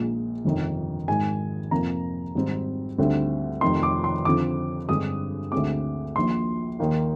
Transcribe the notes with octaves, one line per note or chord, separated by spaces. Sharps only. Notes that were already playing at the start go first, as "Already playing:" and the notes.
Already playing: A#1 A#2 G#3
G1 F2 C3 D#3
G#1 G#2 D#3 G#5
F2 C3 F3 A#3 A#5
G#1 G#2 G3 C4
D2 D3 G3 C4
F1 F2 C3 D#3 C6
D6
C6
F2 D3 F3 C4 D6
G2 D3 G#3 C4 D#6
D2 D3 G#3 C4 D6
A#1 A#2 F3 C6
D#2 D#3 A#3